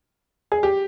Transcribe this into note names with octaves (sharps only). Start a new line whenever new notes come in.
G#4
G4